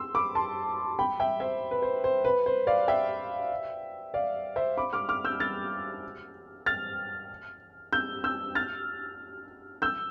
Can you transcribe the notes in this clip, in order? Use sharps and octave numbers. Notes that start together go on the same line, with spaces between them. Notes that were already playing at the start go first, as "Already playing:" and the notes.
Already playing: C6 E6
B5 D6
A5 C6
G5 B5
E5 G5
C5 E5
B4
C5
C5
B4
C5
D5 F5
E5 G5
D5 F5
C5 E5
B5 D6
D6 F6
D6 F6
E6 G6
F6 A6
F6 A6
E6 G6
E6 G6
F6 A6
E6 G6